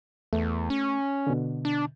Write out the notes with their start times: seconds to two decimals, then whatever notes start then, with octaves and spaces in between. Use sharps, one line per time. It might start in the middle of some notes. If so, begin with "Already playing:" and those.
0.33 E2 A3
0.70 C#4
1.27 B2 D3
1.65 D4